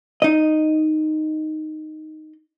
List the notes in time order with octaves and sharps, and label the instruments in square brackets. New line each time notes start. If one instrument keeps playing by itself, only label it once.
[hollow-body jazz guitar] D#4 D#5